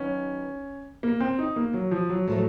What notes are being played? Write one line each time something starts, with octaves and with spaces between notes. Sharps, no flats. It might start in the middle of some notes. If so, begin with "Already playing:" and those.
Already playing: D#3 F#3 B3 C#4 D#4 F#4
A#3
C4
D#4
A#3
F#3
F3
F#3
A2 F3 F#3 A3